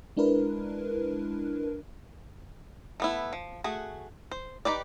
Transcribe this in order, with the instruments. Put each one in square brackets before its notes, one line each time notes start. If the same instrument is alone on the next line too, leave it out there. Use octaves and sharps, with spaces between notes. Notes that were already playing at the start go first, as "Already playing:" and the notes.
[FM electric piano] G#3 D4 E4 A#4 B4
[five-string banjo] A3 B3 E4
F3
A3 F#4 G#4
C5
D#4 G4 B4 D5